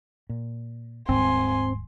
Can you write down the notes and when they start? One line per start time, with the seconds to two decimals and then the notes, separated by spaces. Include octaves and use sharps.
0.29 A#2
1.09 D#1 G#2 D#3 C4 G#5 C6